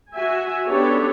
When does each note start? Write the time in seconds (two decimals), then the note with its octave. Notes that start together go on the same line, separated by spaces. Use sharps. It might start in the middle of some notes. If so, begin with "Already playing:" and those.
0.13 F#4 E5 G#5
0.67 B3 C#4 D4 G4 A4 C#5